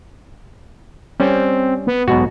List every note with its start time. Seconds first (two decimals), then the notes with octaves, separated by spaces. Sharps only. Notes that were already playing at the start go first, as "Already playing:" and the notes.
1.20 G3 C4 C#4
1.87 B3
2.08 B1 G#2 B2 F#4